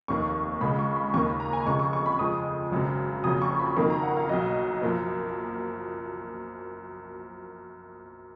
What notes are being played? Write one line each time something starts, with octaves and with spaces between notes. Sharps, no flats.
F1 D#2 D#3 C#6
C#2 C#3 G#3 B5
C#6
B5
D#2 D#3 A#3 C#6
B5
A#5
G#5
F1 F2 C#3 G#3 C#6
C#6
C#6
B5
F2 F3 G#3 D#6
G#1 F#2 C#3
F#1 F2 C#3 F#3 D#6
C#6
B5
F2 D#3 F#3 A#3 B5
A#5
F#5
F5
B1 B2 F#3 D#5
F#2 F3 A#3